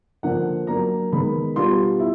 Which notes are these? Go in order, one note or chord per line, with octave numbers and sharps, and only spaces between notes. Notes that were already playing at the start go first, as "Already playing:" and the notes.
D3 F3 A#3 D4 F#5
F#3 A#3 D4 A#5
D#3 G#3 B3 B5
B2 G3 B3 D4 F4 C6
E4